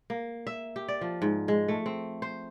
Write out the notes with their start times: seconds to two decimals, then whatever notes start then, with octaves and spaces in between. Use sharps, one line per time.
0.10 A#3
0.47 E5
0.76 G4
0.88 D5
1.01 F3
1.22 G#2
1.48 G#3
1.68 A3
1.86 C4
2.22 C5